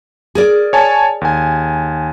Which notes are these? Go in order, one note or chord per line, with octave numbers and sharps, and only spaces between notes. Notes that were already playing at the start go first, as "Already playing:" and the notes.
G#4 A#4 D5
C#5 G#5 A5
D#2 G#5